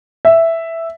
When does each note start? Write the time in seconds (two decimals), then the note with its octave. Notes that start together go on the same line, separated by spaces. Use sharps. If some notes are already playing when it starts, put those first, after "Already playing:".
0.25 E5